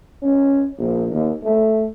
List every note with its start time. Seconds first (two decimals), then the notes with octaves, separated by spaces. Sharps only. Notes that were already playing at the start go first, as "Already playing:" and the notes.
0.23 C#4
0.78 A#1
1.12 D#2
1.43 A3